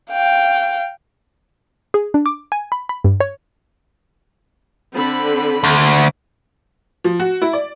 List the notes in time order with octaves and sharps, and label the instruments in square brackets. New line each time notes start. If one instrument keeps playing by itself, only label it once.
[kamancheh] F5 G5
[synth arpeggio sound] G#4
D4
D6
G#5
B5
B5
G2
C#5
[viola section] D3 C4 B5
[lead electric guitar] D2
[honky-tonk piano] F3
F#4
E4
D5